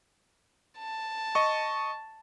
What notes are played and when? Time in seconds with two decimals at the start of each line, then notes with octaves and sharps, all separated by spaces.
0.79 A5
1.35 D#5 C#6